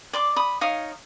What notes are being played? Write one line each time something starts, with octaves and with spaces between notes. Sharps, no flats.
D5 C6 D6
B5 D#6
D#4 C#5 F5 D#6